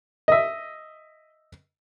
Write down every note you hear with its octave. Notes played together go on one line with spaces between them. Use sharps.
D#5 E5